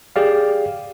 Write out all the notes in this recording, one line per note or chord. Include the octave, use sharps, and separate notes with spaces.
G4 G#4 D5 F5